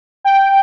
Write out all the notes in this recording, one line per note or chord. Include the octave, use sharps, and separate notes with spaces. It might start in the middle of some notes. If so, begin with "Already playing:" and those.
G5